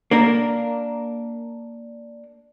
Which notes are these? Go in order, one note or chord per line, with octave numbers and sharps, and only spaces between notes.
A#3 D4 A#4